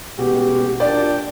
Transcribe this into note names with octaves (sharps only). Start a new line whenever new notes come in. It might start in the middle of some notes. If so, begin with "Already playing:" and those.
A1 B2 G#3 F#4 G4
A#2 D4 D5 G5